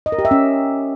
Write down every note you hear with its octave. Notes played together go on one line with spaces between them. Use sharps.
D#5
A#4
G4
E5
C#4